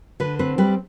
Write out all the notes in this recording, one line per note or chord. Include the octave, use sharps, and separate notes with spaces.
D3 B4
C4 B4
G3 B4